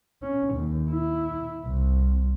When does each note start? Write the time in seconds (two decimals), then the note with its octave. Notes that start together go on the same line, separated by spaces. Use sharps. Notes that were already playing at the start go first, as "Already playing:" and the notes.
0.22 C#4
0.54 D#2
0.90 E4
1.66 C2